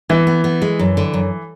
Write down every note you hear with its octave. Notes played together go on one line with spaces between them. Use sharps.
E3 B3
B3
B3
G#3
F#2
D3
F#2